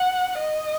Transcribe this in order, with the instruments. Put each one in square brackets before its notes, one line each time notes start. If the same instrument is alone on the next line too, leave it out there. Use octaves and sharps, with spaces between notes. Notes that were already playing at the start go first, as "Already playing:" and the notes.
Already playing: [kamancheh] F#5
D#5